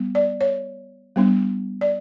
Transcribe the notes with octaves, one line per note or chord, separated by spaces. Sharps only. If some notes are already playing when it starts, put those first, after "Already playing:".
Already playing: G3 B3
D5
C#5
G3 B3 D4
D5